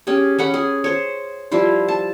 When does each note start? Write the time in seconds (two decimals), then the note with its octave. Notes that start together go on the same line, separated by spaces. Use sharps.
0.07 C#4 G4 G#4
0.39 C#4 F#5 B5
0.54 G#4
0.84 C5 C#5
1.52 F3 G3 E4 C5
1.88 A5